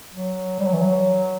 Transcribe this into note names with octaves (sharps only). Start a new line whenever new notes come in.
F#3
G3
F#3
E3
F#3